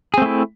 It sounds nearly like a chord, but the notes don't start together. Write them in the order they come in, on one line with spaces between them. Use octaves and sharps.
G#4 C4 A3 E4